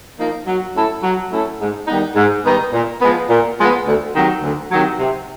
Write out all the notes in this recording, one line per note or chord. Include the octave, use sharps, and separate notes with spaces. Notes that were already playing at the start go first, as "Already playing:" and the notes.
F3 A#3 D#4
F#3
A3 C#4 E4 A4
F#3
A3 C#4 E4 A4
G#2
D#3 G3 B3 D#4
G#2
D#3 G3 B3 D#4
A#2
F3 G#3 B3
A#2
F3 G#3 B3
D2
C3 D#3 F#3
D2
C3 D#3 F#3
C3